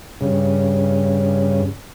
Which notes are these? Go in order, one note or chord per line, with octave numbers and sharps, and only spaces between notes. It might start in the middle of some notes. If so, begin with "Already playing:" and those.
G2 C#3